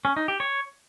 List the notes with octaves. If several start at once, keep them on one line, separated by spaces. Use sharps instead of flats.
C#4
D#4
G4
C#5